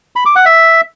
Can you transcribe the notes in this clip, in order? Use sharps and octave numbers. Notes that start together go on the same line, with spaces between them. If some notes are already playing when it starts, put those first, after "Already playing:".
B5
D6
F#5
E5